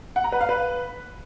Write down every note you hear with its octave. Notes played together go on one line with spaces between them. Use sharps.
F#5
A#5
B4
F5
B4